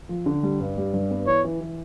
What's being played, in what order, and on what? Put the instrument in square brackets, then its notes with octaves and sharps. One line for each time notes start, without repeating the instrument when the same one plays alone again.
[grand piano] F3
D3
G3
G2
G3
G2
B3
[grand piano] E3 [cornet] C#5
[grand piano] E3
E3